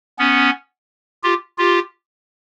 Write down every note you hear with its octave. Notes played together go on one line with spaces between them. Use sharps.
B3 C#4
F4 G4
F4 G4